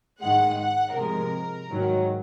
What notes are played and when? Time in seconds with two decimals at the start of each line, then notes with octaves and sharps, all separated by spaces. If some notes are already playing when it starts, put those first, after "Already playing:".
0.21 G#2 D#3 G#3 F#5
0.58 F#5
0.95 C3 F3 G#3 A#4
1.69 G#2 D#3 F#3